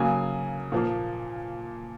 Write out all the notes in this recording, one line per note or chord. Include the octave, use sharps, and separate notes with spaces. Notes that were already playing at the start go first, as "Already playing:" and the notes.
Already playing: C#3 F#3 A#3 G#5
A#2 F3 A#3